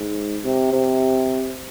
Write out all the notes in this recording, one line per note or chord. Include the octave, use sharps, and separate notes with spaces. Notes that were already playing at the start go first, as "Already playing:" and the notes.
Already playing: G#2
C3
C3